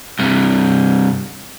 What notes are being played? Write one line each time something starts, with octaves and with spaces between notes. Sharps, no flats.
G2 C3